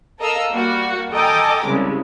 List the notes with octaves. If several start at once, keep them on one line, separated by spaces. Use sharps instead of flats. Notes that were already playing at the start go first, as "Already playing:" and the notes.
A4 A#4 D#5 F5 A#5 E6
G3 A#3 F#4
A4 D#5 G5 G#5 A#5 D6
C2 C#3 G#3